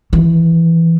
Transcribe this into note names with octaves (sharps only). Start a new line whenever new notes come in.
D#3 E3